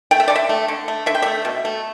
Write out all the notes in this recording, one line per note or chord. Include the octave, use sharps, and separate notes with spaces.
A3 G5
E5
D3 D5
E5
A3
D3
A3
D3 E5
G5
A3 E5
B2
A3